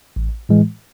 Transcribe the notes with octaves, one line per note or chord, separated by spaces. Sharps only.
A1
A2 E3 G#3